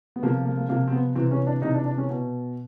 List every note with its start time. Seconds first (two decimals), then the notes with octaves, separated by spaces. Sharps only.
0.16 B3
0.22 C3 F3 A#3
0.45 A#3
0.57 A#3
0.69 C3 F3 A#3
0.88 C4
0.92 B3
1.15 C3 E3 C4
1.31 C#4
1.47 D4
1.62 C3 E3 D#4
1.74 D4
1.85 D4
1.98 C#4
2.09 B2